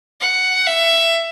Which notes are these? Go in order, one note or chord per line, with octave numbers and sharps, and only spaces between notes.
F#5
E5